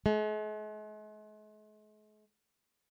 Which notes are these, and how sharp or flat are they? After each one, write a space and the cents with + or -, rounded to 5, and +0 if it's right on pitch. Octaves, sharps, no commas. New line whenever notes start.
G#3 +45